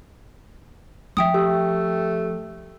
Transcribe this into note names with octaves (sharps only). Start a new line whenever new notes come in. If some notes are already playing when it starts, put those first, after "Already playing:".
F3 E5 G5 D#6
A3 G4